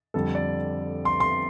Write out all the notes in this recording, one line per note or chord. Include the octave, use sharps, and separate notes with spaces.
F2 D3 G3 A4
D5
C6
C6